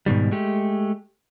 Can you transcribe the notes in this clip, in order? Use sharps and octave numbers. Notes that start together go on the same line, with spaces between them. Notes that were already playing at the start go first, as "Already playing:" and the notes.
G#2 B2 D#3 G3
G#3 A3 G4